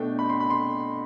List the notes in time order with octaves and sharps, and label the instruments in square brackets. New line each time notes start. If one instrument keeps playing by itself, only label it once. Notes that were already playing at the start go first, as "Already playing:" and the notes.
Already playing: [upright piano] B2 A3 D4 G5
B5
C6
B5
C6